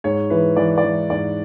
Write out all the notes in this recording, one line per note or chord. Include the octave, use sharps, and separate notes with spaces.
G#2 C#5
E3 B4
E3 D5
D5
E3
G#2 D5